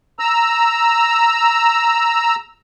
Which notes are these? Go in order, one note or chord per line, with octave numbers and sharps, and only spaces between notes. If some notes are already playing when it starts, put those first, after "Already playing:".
A#5 E6